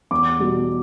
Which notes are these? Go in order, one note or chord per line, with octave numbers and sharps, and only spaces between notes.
E2 D6
B2 G3